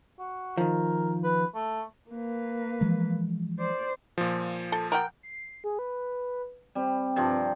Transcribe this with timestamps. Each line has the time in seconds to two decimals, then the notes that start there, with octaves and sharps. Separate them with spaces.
0.19 F#4
0.57 D#3 F3 A#4
1.24 B4
1.55 A3
2.11 A#3 B4
2.81 E3 F3 G#3
3.59 C5 D5
4.18 A#2 F3
4.72 A4
4.92 A#4 F#5 G5
5.23 C7
5.64 G#4
5.79 B4
6.75 G3 C4
7.16 G2 C3 F3